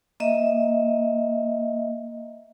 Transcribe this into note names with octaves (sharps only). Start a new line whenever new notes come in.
A#3 D#5 E5